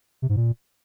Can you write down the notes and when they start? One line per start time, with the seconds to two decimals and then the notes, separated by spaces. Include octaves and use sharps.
0.22 C3
0.29 G#2
0.36 A#2